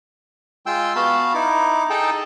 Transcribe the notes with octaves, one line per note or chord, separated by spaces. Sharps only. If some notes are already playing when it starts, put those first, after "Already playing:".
G#3 F4 G5 C6 E6
B3 F#4 F5 A5 B5
D#4 E4 D6
D#4 G#4 A4 G5 A5